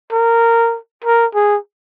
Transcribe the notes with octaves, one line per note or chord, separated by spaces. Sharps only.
A#4
A#4
G#4